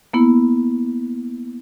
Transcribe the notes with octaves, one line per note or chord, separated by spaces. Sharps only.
A#3 B3 E4